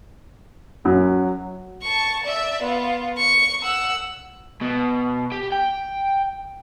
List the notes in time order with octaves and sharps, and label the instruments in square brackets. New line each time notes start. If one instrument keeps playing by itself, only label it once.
[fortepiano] F#2 [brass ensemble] F#3
[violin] A5 C#6
D5 E5
B3 F4
C#6 C#7
F#5 E6
[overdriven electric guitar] B2
G4
G5